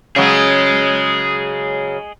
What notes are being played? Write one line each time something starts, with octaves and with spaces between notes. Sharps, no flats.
C#3 F#3 G#4 D#5